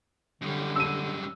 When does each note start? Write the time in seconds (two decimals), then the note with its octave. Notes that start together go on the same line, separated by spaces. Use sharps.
0.41 F#2 D3 G3
0.76 E6 D#7